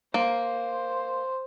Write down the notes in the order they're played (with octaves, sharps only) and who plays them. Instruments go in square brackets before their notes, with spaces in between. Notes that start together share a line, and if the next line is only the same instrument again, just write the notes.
[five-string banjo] A#3 [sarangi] C5